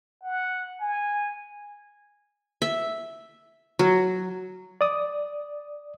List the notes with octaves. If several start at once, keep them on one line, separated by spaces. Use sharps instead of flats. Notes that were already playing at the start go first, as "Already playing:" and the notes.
F#5
G#5
E5
F#3
D5 D#6